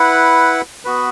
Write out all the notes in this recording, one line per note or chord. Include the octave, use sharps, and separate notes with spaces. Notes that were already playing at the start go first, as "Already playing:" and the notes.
Already playing: E4 B4 F#5
B3 F#4 B4